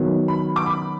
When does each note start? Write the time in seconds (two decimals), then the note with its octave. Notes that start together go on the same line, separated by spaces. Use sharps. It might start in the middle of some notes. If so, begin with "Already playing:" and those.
Already playing: D#3 F#3 B3
0.28 B5
0.56 D6
0.66 B5